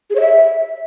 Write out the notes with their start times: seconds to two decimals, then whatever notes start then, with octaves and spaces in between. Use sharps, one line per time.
0.10 G#4
0.15 C#5
0.21 E5